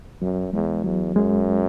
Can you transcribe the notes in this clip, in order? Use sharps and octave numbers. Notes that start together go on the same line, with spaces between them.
F#2 F#3
E2 G#3
E2 F#3
F#2 G#3